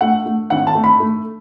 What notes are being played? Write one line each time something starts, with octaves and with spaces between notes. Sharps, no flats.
A3 F#5
A3
G#1 F#5
A5
A3
B5
A3